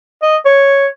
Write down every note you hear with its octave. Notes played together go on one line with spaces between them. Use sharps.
D#5
C#5